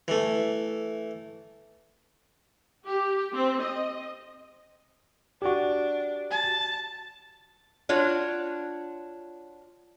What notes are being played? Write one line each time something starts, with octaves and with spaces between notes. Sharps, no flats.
E3 A3
G4
C4
D#5
D4 F#4 G4
A5
D4 F4 F#4 C#5